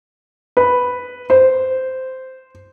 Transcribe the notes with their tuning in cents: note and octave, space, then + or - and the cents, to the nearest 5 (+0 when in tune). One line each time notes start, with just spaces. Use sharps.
B4 +0
C5 -10